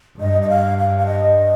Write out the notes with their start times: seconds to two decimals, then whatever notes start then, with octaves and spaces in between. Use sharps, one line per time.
0.20 G2 D#5
0.42 D#5
0.49 F5
0.78 F5
0.98 F5
1.06 D#5